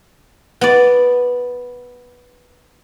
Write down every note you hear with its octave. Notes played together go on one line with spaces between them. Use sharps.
B3 D5